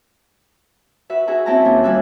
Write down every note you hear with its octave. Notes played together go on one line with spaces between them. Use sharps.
F#4 B4 E5
F#4 G#4 E5 A#5
C4 C#4 E4 E5 A5 A#5
D#2 B3 F4 G#5
D#2 G3 G#5 E6 F#6